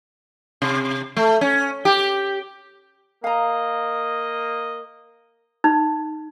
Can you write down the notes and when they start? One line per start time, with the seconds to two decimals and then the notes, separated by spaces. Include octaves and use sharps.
0.62 C3
1.17 A3
1.41 C#4
1.85 G4
3.24 A#3 D#5 F5 A#5
5.64 D#4